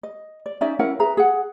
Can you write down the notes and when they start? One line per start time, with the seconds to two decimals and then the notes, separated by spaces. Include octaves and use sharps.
0.03 D#5
0.46 D5
0.61 C#4 D#4 D5 E5
0.79 C#4 E4 A#4 F#5
0.99 G#4 B4 E5 A#5
1.17 G#4 F#5